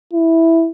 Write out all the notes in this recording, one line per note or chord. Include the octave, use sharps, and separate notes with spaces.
E4